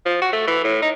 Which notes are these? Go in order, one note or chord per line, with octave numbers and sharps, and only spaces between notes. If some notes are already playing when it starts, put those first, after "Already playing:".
F3
F#4
A3
E3
A2
D#4